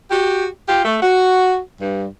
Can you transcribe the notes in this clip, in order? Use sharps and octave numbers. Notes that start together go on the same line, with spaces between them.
F#4 G4
F4 G4
A3
F#4
G2